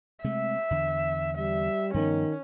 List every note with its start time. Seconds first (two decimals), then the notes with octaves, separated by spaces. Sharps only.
0.24 C3 G#3 A3 E5
0.71 E2 D3
1.37 G3 E5
1.94 G2 D#3 F3 B3 C#4